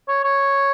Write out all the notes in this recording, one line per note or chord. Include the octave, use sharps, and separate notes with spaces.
C#5
C#5